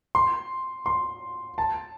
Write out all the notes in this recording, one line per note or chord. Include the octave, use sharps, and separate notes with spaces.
C6
C6
A5